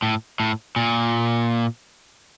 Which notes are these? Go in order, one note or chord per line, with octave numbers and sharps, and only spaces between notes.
A2
A2
A#2